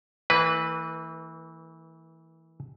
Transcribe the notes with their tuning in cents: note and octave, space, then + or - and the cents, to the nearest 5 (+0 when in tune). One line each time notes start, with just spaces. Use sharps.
E3 -20 A#3 -45 B4 +0